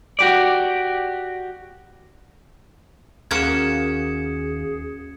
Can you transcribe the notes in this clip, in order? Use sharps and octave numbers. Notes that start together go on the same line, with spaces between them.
F#4 G4 D5
D#2 A#3 C#4 F#4 G#4 G#6 C#7 E7